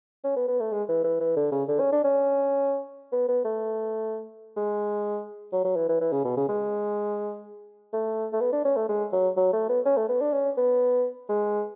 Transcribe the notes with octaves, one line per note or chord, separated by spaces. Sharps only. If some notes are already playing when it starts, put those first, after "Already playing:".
C#4
B3
B3
A3
G#3
E3
E3
E3
D3
C#3
D3
C#4
D4
C#4
B3
B3
A3
G#3
F#3
F#3
E3
E3
E3
C#3
B2
C#3
G#3
A3
A3
B3
D4
C#4
A3
G#3
F#3
F#3
A3
B3
C#4
A3
B3
D4
C#4
B3
G#3